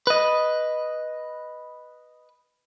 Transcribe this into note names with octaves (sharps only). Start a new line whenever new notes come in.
B4 D#5